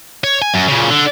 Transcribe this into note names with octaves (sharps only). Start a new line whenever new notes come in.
C#5
G#5
F#2
A#2 C#3
D3